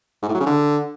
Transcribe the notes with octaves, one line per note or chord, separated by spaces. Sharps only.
G#2
A2
F#3
C#3
D3